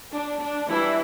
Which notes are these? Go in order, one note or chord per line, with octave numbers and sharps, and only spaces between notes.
D4
D4
E3 G3 D4 E4